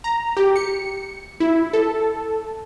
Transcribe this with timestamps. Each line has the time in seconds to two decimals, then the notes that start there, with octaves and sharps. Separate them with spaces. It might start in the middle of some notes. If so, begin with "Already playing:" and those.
0.04 A#5
0.37 G4
0.56 C#7
1.40 E4
1.73 A4